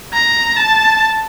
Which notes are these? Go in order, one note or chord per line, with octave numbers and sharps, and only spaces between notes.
A#5
A5